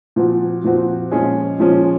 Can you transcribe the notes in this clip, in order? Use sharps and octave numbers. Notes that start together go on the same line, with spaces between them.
A#2 F3 C4 F#4
A#2 F3 C4 F#4
A#2 F3 G#3 C#4 G#4
A#2 F3 G#3 C#4 G#4